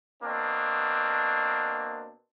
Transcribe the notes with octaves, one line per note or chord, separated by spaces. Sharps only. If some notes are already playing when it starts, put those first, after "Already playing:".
B2 A#3 C4 D4